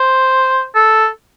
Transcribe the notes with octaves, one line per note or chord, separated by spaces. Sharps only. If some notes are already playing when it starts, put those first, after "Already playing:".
Already playing: C5
A4